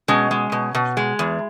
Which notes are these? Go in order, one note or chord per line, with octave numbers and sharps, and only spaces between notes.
B2 G#3 C#4
G#3
B2
B2
G#3
E2